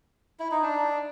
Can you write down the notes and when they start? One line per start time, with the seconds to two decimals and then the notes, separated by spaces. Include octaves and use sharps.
0.39 E4
0.51 D#4
0.63 D4